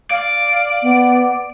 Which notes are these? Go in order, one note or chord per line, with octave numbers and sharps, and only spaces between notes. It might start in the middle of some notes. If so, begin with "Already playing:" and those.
D5 F5
B3